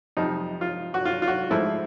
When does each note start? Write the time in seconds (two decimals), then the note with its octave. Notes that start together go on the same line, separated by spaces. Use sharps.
0.17 F2 C3 F3 D#4
0.61 F4
0.94 F#4
1.05 F4
1.22 F4
1.28 F#4
1.50 G#2 F3 A3 E4